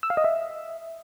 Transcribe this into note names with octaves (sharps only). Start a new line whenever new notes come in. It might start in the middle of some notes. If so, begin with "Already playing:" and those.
E6
F5
D#5
E5